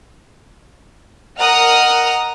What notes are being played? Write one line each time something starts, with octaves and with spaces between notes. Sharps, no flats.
A#4 D#5 F#5 A#5 D#6 F6